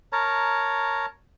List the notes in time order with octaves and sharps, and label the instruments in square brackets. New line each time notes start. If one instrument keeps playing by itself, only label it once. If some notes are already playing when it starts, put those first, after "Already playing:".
[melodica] A#4 C#5 A5 A#5